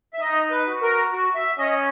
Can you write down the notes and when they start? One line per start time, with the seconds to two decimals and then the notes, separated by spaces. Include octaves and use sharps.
0.14 E5
0.20 D#4 D#5
0.51 B4
0.66 F#4
0.82 A#4
1.13 F#4
1.35 E5
1.58 C#4 D#5